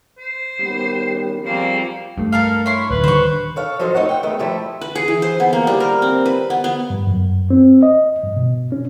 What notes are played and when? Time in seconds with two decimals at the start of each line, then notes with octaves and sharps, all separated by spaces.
0.18 C5
0.59 D#3 G3 B3 C#4 G4
1.46 F3 G3 A#3 C4 G#4 C5 C#6
2.18 G2 A3
2.32 A4 A#4 F5
2.66 E4 C#5 C6
2.91 D1 B4
3.04 D3 D#3 G3 C5 C#6
3.56 A4 C#5 F5
3.79 F3 F#3 A4 C5 D#5
3.94 A3 D#4 C#5 F#5
4.09 F#4 G5
4.23 D#3 G#3 A3 B3
4.39 F3 G3 A3 E4
4.81 B4
4.95 G#4
5.08 E3
5.22 C5
5.40 B3
5.53 A#3
5.67 G3
5.80 A#4
6.02 C4
6.26 B4
6.50 B3
6.64 B3
6.90 G2
7.07 F#2
7.50 C4
7.83 D#5
8.24 G2
8.36 B2
8.72 C#4